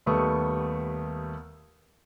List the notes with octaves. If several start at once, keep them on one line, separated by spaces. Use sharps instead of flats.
D#2 G3 A3 B3 C#6 D#6